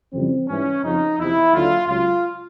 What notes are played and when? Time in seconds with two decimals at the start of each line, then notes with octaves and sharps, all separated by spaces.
0.13 F2 C#3 E3 G3 C4
0.48 G#2 E3 G3 C#4
0.83 F2 C#3 F3 D#4
1.18 E2 C3 F3 E4
1.53 D#2 D3 F#3 F4
1.87 C#2 C#3 F#3 F4